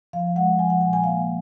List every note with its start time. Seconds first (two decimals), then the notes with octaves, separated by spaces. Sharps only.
0.13 F3 F5
0.36 G#3 F#5
0.58 F3 G#5
0.70 F#5
0.81 A#2 G#5
0.93 G#5
1.04 A#3 F5